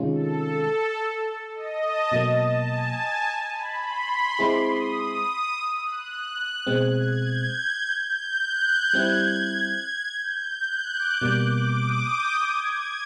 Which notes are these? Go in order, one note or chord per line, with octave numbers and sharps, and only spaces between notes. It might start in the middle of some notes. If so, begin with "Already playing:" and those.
Already playing: C3 D#3 G#3 C#4 F4
A4
D#5
A5
B2 F#3 A#3
A5
G#5
A5
A#5
B5
C6
G#3 C4 E4 G#4 D6
D#6
D#6
D#6
E6
F#6
B2 G#3 C4 G#6
G#6
G6
G6
G6
G6
F#6
G#6
G3 C4 E4
G6
F#6
D6
B2 G3 A#3 D6
D6
D#6
G6
G#6